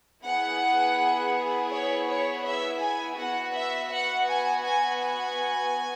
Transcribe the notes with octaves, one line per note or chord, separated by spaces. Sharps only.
B3 E4 G#4 F#5
C#5
C#5
E5
G#5
B3 F#4 F#5
E5
F#5
G#5
G#5
G#5